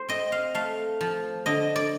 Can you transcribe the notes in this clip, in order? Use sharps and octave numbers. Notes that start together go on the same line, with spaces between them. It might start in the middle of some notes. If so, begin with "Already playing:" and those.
Already playing: C5
C4 D#5
F5
A3 F5
F3
D3 D#5
D5